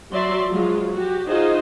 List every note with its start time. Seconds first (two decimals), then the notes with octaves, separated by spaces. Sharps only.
0.12 F#3 F#4 D5 E5 C6
0.47 F3 F#3 G#3 F4
0.92 F#4 G4
1.26 D#4 F4 F#4 G#4 C5 D#5